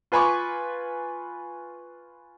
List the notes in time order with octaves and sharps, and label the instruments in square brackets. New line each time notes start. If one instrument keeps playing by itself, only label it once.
[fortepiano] F4 B4 G#5 B5 C#6 D6